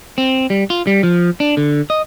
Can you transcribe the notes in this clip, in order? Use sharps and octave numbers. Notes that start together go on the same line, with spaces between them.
C4
G3
F4
G3
F3
D4
D3
D#5